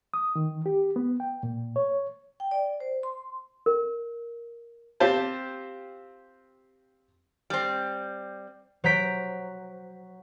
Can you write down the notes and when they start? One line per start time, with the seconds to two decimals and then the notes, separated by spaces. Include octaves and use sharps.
0.14 D#6
0.36 D#3
0.66 G4
0.96 B3
1.20 G5
1.43 A#2
1.76 C#5
2.40 G5
2.51 D5
2.80 C5
3.03 C6
3.66 A#4
5.00 C4 F4 G4 C5 A5
7.50 G3 C4
8.84 F#3 C5 A#5 G6 B6 D7